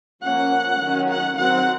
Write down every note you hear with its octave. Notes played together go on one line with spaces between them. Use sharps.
F3 A#3 C#4 F#5
D#3 F#3 C#4
F#5
D#3 F#3 C4 F#5